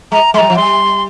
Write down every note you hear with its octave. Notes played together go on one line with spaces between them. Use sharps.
G#3 A#5
G#3 C6
G3 A#5
F3
G3 C6